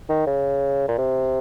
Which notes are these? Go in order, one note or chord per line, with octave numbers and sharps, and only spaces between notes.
D#3
C#3
A#2
C3